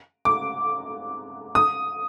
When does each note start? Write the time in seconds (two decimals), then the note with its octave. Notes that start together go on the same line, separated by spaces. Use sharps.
0.25 D6
1.55 D#6